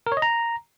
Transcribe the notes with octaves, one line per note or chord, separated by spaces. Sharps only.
A#4
C#5
D#5
A#5